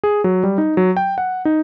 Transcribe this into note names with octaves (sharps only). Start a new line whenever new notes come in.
G#4
F#3
G3
D#4
F#3
G5
F#5
D#4